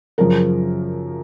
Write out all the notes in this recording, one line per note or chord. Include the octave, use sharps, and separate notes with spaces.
F#2 C#3 F3 A#4